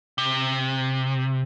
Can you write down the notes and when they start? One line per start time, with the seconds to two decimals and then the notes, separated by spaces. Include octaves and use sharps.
0.18 C3